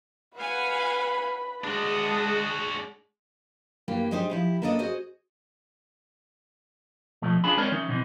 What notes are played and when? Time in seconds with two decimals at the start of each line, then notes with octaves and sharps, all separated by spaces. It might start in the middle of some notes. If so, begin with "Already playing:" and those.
0.37 B4 F5 F#5 G#5 B5
1.64 G#3 D4 F#4 A5 D#6
3.88 G2 E3 A#3 G4
4.11 G#3 D4 D#4 G4 C5
4.30 F3 E4 G4
4.62 A#3 B3 D4 E4 A4 D#5
4.79 F#4 G#4 C5 D#5
7.22 B2 F3 A3
7.44 C#4 D4 F4 G#4 A5 B5
7.57 G#3 C4 A#4 C#5 D5
7.72 E3 C#4 D#4
7.89 B2 E3 C4